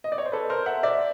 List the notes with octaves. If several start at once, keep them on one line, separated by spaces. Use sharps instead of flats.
D#5
D5
C#5
C5
A4 B4
A#4 C5
E5 F#5
D5 E5